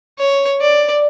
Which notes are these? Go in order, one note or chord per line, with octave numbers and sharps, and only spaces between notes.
C#5
D5